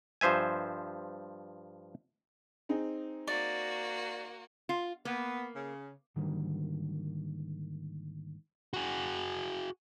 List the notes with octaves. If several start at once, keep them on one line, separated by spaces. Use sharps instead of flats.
G2 F3 C5 E5 G#5
C4 D#4 G#4
A#3 F#4 D5
F4
A#3 B3
C#3
G#2 D3 D#3 F#3 G3 A#3
F#4 G#4